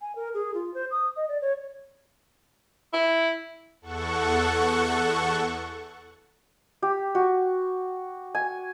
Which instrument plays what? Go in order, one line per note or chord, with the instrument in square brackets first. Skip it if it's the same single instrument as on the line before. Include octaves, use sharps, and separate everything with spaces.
[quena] G#5
A#4
G#4
F4
C5
D#6
D#5
D5
C#5
[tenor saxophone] E4
[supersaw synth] E2 A4 F#5 C#6
[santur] G4
F#4
G#5